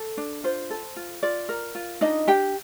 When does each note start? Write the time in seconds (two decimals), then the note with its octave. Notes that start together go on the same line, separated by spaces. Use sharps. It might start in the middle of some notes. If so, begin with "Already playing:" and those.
Already playing: A4
0.17 D4
0.44 F4 C5
0.70 A4
0.96 F4
1.23 F4 D5
1.49 A#4
1.75 F4
2.01 D4 D#4 D#5
2.28 D4 G4 G5